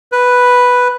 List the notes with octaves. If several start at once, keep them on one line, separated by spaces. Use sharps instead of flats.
B4